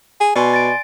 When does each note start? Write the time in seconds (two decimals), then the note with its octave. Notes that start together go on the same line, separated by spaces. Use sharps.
0.20 G#4
0.36 B2 D5 G#5 C6
0.53 A6 D7